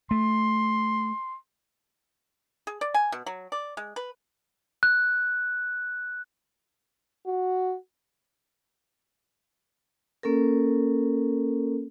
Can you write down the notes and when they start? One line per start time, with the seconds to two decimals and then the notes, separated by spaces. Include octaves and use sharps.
0.11 A3 C6
2.67 G#4
2.81 D5
2.94 G#5
3.12 B2
3.26 F#3
3.52 D5
3.77 G#3
3.96 B4
4.83 F#6
7.26 F#4
10.23 A#3 C#4 A4 A#4